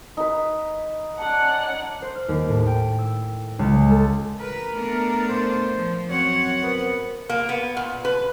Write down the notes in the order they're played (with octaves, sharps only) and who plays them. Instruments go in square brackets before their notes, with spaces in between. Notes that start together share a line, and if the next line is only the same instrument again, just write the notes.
[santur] D#4 B4
[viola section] C#4 D5 F#5 [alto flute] A5
[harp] C5
F6
D#2
A2
G5
E6
C#2
G#3
A4
[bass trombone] A1 [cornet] A#4 [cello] B4
[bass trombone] A3 [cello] B3 D4
[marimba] A#2 [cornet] C5
[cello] F3
[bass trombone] F#2 [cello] C4 F#5 [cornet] C#5
[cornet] B3 [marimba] A#4 C5
[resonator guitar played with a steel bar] A#3
B3
A#2
B4